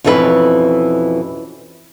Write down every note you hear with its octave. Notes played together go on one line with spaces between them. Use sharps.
F2 B2 E3 C#4 G#4 B4